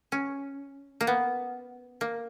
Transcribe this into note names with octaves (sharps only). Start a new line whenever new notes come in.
C#4
A#3
B3
A#3